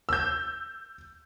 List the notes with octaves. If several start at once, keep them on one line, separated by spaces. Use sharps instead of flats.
E6 G6